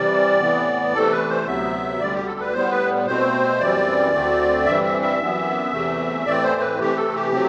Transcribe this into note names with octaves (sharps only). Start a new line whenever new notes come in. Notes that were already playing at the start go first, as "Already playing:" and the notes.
Already playing: C3 E3 G3 D5
A2 E3 B3
C3 E3 A3 A4
B4
C5
D2 C3 F#3 B3 E5
D2 D3 G3 D5
G4
A4
B4
A2 G3 B3 C5
B4
B2 A3 C4 C5
F#2 E3 G3 C4 D5
D2 D3 A3 C4
G2 E3 G3 C4 E5
E5
E5
F#2 E3 B3
E2 C3 E3 A3
A2 E3 A3 C4 D5
C5
B4
C3 E3 A3 G4
A4
G4
C3 F#3 A3 C4